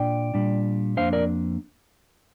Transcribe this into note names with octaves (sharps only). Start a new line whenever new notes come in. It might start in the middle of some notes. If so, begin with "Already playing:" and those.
Already playing: A#2 D4 D5 G5
A#2 G3 D4
F2 F3 A#3 D4 C5 F5
A#4 D5